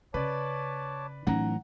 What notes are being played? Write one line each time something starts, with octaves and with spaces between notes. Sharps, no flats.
C#3 B4 C#5 D5 A5 D6
A2 E3 F#3 C#4 D#4 F#5 A#5